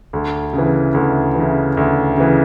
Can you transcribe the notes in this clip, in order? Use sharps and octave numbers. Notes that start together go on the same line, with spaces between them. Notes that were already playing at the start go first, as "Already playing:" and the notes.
D2
C#3 E3
D2
C#3 E3
D2
C#3 E3